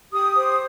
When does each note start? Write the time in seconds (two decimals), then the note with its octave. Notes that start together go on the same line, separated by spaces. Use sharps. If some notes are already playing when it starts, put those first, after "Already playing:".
0.11 G4 D#6
0.36 C5